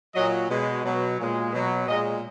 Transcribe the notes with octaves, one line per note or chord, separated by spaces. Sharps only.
A#2 F#3 D#5
B2 G#3
B2 F#3
A#2 G#3
B2 F#3
A#2 G#3 D#5